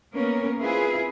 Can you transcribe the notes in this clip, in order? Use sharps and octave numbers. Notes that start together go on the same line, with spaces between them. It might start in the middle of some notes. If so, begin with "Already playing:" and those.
A#3 B3 C#4 A#4
C4 E4 F4 G#4 B4